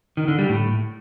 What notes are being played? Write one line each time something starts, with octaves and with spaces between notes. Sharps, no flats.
D#3
D3
G3
A2